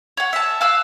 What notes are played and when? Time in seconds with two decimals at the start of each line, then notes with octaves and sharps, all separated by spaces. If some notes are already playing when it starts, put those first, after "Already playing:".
0.17 C#5 F#5
0.33 E5 A5
0.61 F5 E6 F#6